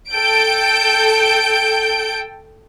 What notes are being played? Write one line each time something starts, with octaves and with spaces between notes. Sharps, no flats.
A4 G5 G6 D7